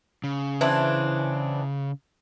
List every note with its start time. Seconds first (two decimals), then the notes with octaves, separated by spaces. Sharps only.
0.24 C#3
0.61 E3 C4 D4